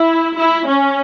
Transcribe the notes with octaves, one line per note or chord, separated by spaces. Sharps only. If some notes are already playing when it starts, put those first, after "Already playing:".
Already playing: E4
E4
C#4